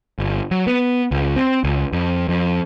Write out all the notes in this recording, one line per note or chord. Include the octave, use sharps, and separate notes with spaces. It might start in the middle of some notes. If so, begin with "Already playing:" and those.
G1
F#3
B3
C#2
C4
C#2
F2
F2